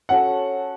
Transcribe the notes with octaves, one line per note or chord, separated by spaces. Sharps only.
C#4 F#4 A4 F#5